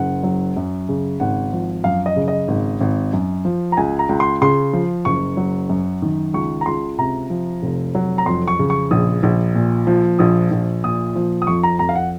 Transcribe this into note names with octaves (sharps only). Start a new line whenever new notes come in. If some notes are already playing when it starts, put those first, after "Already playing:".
Already playing: F#1 F#5
F#3
F#2
C#3
G#1 F#5
F3
F#2 F5
D#5
C#3
D#5
G#1
G#1
F#2
F3
A#5
C#2 G#5
A#5
C#2
C6
C#3 C6
F3
F#1 C#6
F#3
F#2
D#3
C#2 C#6
A#5
C#2 C6
C3 A#5
F3
F1
F#3
A#5
F2 C6
C#6
C#3
C#6
A#1 D#6
A#1
A#2
F3
A#1 D#6
A#1
A#2 D#6
F3
D#6
F2 C#6
A#5
F2 A#5
F5
F#5